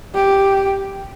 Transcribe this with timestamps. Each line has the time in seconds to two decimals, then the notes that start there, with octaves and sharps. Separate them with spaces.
0.15 G4